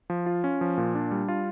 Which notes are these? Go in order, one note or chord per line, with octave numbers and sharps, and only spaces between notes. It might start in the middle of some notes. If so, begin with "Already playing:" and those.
F3
F4
C#4
F3
A#2
D4
G3
F4